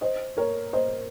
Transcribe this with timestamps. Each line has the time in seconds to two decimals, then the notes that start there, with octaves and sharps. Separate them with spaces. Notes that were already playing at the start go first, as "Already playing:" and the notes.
0.01 C5 D#5
0.37 A#4 C#5
0.73 C5 D#5